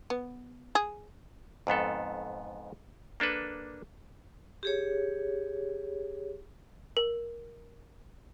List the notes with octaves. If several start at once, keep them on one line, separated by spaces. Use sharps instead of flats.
B3
G#4
F2 G#2 B3 A4
A#3 D4 A4 B4
G4 G#4 C#5
A#4